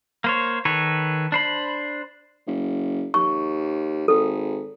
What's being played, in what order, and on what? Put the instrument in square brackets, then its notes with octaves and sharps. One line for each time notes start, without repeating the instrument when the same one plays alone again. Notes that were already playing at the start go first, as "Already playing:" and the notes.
[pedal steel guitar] A#3 C5 C#5
D#3 A4 B4 C#5
D4 C5 B5
[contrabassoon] F#1
[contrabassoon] D#2 [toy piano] C#6
[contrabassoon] G#1 [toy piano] A4